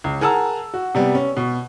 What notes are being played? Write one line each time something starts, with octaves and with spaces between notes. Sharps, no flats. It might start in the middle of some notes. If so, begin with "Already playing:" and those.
C#2
G#4 A#4 F#5 A5 A#5 E6
F#4
C3 G3 B3
C#4
B2